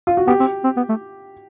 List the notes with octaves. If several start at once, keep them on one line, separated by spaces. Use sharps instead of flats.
F4
F#4
B3 G4
C4
C4
B3
A3